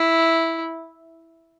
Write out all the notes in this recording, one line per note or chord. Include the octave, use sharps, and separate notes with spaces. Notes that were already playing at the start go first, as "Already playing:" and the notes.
Already playing: E4